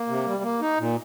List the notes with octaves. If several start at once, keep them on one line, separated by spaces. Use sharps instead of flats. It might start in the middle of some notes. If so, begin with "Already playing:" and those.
Already playing: A#3
C3
G3
A#3
D#4
A#2